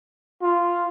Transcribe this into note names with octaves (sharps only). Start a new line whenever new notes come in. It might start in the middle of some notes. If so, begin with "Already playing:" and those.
F4